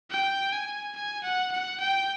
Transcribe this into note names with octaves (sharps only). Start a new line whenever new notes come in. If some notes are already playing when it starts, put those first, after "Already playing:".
G5
G#5
G#5
F#5
F#5
G5